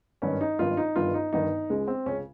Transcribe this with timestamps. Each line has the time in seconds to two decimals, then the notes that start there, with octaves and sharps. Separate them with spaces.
0.22 G#1 G2 D#3 C#4
0.41 D#4
0.59 G#1 G2 D#3 F4
0.77 D#4
0.96 G1 G2 D#3 F4
1.14 D#4
1.33 G1 G2 D#3 D#4
1.70 C#2 C#3 G#3
1.88 C4
2.06 C#2 C#4
2.11 C#3